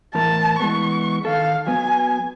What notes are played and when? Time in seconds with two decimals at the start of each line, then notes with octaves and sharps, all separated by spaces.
0.15 E2 A2 A#4 A5
0.60 E3 G#3 B3 C#6
1.25 D#3 A4 F5
1.67 F#3 B3 G#5